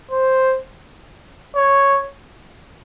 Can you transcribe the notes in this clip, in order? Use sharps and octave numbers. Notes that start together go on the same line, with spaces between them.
C5
C#5